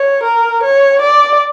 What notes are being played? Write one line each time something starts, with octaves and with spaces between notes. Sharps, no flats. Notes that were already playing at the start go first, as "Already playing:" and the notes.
Already playing: C#5
A#4
C#5
D5